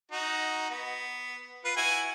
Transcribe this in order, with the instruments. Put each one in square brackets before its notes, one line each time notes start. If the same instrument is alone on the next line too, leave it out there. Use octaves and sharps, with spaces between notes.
[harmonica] D#4 F#4
B3
F4 B4
E4 F#4 G#5